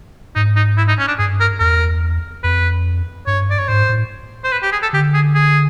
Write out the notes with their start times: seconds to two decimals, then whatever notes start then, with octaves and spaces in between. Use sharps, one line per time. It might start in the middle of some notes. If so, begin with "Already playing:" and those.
0.36 G#2 D#4
0.56 D#4
0.78 E4
0.88 D#4
0.99 C#4
1.08 D4
1.19 G2 G#4
1.40 A#4
1.60 E2 A#4
2.44 F2 B4
3.27 G2 C#5
3.50 D5
3.59 C#5
3.68 G#2 C5
3.89 A2
4.44 C5
4.52 B4
4.63 G4
4.72 G#4
4.82 A4
4.93 D3 G4
5.14 G#4
5.35 G#4